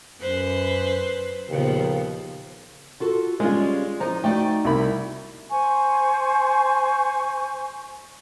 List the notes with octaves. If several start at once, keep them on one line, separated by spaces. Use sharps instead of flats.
F#2 F#3 B4 C5
D#2 A#2 C#3 F3 B3
F4 F#4 A4
G3 G#3 C#4 F4
F3 D#4 A#5
A3 D#4 F#4 D5 G5
C2 E4 B5
C5 G#5 C#6